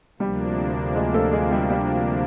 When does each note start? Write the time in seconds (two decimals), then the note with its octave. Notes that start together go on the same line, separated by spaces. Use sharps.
0.20 D2 C3 F3 G3 A#3 D4 G4
0.95 G#3 G#4
1.14 A3 A4
1.33 G#3 G#4
1.51 G3 G4
1.70 G3 G4